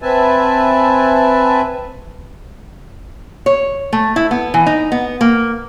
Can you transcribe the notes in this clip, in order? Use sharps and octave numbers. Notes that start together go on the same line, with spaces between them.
C4 B4 E5 G#5 A5
C#5
A3
E4
B3
E3
D#4
B3
A#3